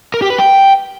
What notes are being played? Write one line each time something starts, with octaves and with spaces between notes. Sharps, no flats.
A#4
G4
B4
G5